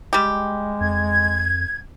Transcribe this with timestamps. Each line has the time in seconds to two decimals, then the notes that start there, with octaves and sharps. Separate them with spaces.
0.13 G3 G#3 G4
0.81 F2 G#6